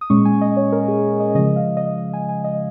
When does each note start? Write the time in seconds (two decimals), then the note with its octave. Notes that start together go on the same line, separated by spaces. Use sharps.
0.01 D#6
0.10 A#2 G#3 C#4 C#6
0.25 G#5
0.41 D#5
0.57 C#5
0.72 A#4
0.88 G#4
1.20 D#5
1.35 C#3 F3 G#3 D#5
1.56 F5
1.77 D#5
1.98 D#5
2.14 G#5
2.29 G#5
2.44 D#5